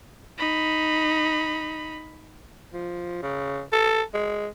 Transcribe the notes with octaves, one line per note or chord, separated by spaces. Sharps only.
D#4 B5
F3
C#3
A4
G#3